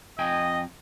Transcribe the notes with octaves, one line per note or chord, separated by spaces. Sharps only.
F2 D#5 G5 G#5